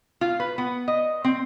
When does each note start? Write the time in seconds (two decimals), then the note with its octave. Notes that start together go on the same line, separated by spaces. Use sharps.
0.21 F4
0.40 B4
0.58 B3
0.88 D#5
1.24 C4